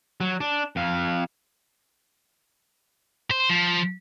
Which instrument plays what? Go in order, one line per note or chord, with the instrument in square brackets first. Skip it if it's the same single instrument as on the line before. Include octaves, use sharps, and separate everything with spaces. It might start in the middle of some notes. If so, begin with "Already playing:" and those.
[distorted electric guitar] F#3
D4
F2 F5
C5
F3